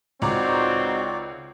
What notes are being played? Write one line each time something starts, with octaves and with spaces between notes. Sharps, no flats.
C#2 C4 D#4 F#4 C#5 D5 A#5 D6